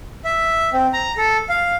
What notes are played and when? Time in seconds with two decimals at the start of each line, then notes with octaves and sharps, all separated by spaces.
0.25 E5
0.73 C4
0.93 A#5
1.17 A4
1.49 F5